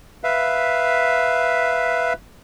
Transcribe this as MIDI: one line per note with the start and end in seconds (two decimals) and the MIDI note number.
0.24 2.13 71
0.24 2.13 76
0.24 2.13 77